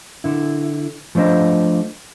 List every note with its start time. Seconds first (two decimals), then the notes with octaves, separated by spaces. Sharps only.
0.24 D3 E4
1.15 F3 A3 D4 C5 D#5